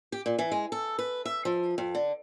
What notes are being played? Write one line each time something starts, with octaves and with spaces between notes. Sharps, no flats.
G4
A#2
E3
G#3
A4
B4
E5
F3
F2
D3